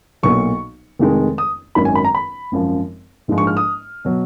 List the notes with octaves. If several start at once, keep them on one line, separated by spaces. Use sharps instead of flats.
B1 A#2 F#3 C#6
F1 F2 D#3 G#3
D#6
G#1 F#2 D#3 F#3 B5
G#5
B5
A#5
B5
G#1 F#2 F3
A#1 G#2 F3 G#3
C#6
F6
D#6
B2 F#3